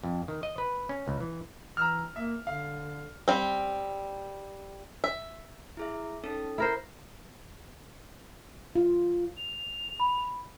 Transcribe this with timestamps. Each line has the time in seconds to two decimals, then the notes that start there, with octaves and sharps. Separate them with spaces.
0.03 F2
0.28 D#3
0.43 D#5
0.58 B4
0.89 C#4
1.08 C#2
1.20 E3
1.77 E3 A#5 E6 F6
2.16 A#3 E5
2.47 D3 F5
3.28 G3 C4
5.04 E5
5.77 E4 G#4 E5
6.24 C#4 D#4 A4
6.58 E4 A#4 C5
8.75 F4
9.37 F7
10.00 B5